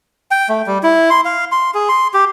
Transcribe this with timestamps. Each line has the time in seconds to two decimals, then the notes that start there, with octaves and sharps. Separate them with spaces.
0.31 G5
0.49 A3
0.67 G3
0.83 E4
1.10 C6
1.25 F5
1.52 C6
1.74 G#4
1.89 C6
2.14 G4